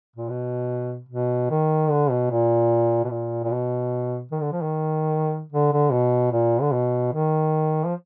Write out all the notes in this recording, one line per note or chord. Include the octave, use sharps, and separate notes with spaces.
A#2
B2
B2
D#3
D3
B2
A#2
B2
A#2
A#2
B2
D#3
D3
F3
D#3
D3
D3
B2
A#2
D3
B2
D#3
F3